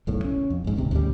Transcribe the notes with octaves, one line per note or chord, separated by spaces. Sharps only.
F#1 B1 A2
C#4
F2
A#1 G#2
D1 G#1 C3
D2 A2 C#3 G3